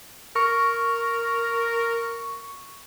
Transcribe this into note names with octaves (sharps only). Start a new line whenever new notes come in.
A#4 C#6